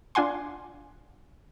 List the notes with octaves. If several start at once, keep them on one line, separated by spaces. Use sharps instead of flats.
D4 F4 F#5 G#5 C6